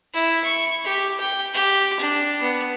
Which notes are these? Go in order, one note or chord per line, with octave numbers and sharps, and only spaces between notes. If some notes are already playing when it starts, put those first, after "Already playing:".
E4
C#6
G4
G5
G4
D4
B3